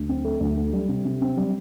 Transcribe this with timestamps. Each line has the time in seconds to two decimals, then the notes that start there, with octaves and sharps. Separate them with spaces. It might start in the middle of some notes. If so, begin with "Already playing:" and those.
Already playing: D2
0.09 C4
0.25 A3
0.40 D2
0.57 A3
0.73 G3
0.89 C3
1.05 C3
1.22 C4
1.37 G3